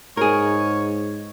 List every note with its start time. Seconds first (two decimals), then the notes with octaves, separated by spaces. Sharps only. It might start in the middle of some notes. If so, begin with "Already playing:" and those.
0.17 G#2 G#4 A#4 C#5